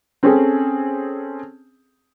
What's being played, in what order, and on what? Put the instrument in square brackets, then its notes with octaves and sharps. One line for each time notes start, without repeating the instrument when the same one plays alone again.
[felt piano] C4 C#4 G#4 A4